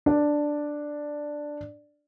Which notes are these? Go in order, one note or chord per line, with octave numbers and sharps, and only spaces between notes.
D4 D5